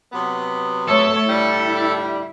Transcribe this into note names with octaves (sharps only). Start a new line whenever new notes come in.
C3 F#3 B3
A3 A4 C#5
A2 D3 G3 E4